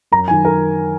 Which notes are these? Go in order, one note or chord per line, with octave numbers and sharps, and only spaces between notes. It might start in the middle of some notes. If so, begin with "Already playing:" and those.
F#2 A#5
D#3 F#3 G#5
A#4